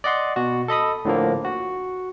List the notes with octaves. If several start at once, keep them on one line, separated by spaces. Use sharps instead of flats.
D5 D#5 F#5 C6
B2 F#4
A4 D#5 B5 D#6
A2 D3 F3 A#3
F#4